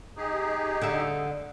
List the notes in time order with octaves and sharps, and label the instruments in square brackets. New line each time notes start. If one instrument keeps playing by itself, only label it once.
[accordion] D#4 G4 G#4
[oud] D3 E5